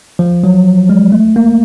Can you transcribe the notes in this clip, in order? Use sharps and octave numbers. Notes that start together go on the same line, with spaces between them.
F3
F#3
G#3
A3
A#3